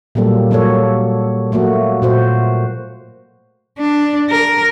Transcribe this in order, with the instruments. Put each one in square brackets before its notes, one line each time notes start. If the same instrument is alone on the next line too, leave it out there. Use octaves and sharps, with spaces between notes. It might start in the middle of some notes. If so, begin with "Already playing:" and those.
[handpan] A#2 F#3 G3 A#3 A4
F#3 A#3 A4 C#5
F#3 A3 A#3 F#4
A#2 F#4 C5
[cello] D4
A#4